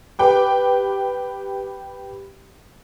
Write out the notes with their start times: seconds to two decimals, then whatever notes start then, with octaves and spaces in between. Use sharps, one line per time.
0.19 G4 B4 G5 D6